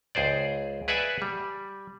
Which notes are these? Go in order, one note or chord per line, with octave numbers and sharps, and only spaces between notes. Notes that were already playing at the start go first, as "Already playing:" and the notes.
C#2 G#4 C5 D5
G#4 B4 D5 E5 F#5 G#5
G3